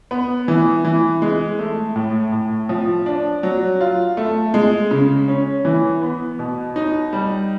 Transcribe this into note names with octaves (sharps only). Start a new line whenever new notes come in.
B3
E3
E3
G#3
A3
A2
A2
F3
D4
F#3
F4
A3
G#3
C#3
C#4
E3
B3
B2
D#4
G3